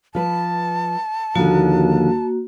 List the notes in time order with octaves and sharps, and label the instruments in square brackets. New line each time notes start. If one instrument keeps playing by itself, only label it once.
[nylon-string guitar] F3 B4 [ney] A5
[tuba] D#2 [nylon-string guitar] D3 F3 [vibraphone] A#3 F#4